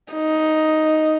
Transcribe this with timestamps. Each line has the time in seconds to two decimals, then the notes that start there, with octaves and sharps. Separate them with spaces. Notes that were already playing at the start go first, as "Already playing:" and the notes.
0.13 D#4